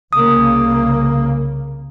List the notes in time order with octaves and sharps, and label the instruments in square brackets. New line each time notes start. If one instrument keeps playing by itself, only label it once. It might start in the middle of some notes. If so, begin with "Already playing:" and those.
[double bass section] C2 C#3 A#3 [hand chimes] D#6